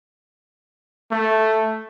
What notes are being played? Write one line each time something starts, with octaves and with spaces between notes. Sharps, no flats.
A3